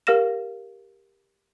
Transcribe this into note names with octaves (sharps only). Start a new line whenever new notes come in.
G4 A#4 F5 F6 A#6 E7